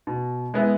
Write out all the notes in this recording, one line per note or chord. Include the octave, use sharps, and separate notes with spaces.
B2
G#3 B3 E4